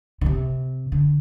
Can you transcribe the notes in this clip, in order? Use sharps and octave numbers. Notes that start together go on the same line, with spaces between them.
D3
C3
D3